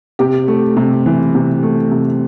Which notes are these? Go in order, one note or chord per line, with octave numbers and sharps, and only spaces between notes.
C3 G4
A3
C3
E3
C3
A3
C3